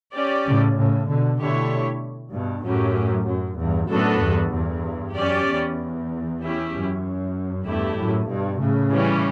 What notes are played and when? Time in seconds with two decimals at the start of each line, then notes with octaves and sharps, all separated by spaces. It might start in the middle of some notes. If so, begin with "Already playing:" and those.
0.13 C#4 G4 D5
0.45 A2 C#3
0.76 A2 C#3
1.07 B2 D3
1.39 B2 D3 A3 E4 G4 C#5
2.33 G2 B2
2.64 F#2 A2 F#3 C#4 G4
3.27 F#2
3.58 E2 G2
3.89 F#2 A2 B3 D4 F#4 A4
4.21 E2 G2
4.52 E2 G2
5.15 F#2 C#4 G4 D5
5.46 E2
6.40 C#4 E4 G4
6.72 F#2
7.66 E2 G2 A3 E4 G4
7.97 F#2 A2
8.29 G2 B2
8.59 A2 C#3
8.92 E3 G3 C#4